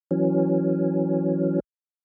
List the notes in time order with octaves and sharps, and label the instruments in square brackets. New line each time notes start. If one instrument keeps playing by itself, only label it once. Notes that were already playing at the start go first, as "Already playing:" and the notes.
[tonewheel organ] E3 F#3 C#4